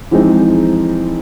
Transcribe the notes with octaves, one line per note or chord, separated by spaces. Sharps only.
E3 F3 G#3 C4 D#4